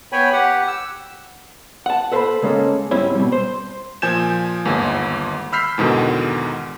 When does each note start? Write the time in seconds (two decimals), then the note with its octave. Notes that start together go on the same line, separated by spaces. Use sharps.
0.12 B3 C#5 G5 G#5 B5
0.33 G4 F#5
0.68 E6
1.86 F#5 A5
2.12 A4 B4 C5 E5 F5 B5
2.42 C#3 G#3 A#3 C#4 A4
2.91 G#2 C#3 G3 C4 C#4 E4
3.15 B2 G3
3.32 C5
4.02 A#2 F3 G#5 G6 G#6 E7
4.65 G1 D#2 G#2
5.52 B5 E6 F6 G6 B6 C7
5.78 E2 G#2 B2 D3 D#3